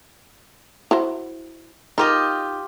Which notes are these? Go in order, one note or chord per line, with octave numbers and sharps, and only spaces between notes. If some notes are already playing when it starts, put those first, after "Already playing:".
E4 F#4 C5
D#4 F4 G4 A#4 D#5